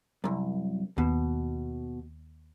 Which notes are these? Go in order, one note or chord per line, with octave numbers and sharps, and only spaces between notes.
C2 F#2
D#2 B2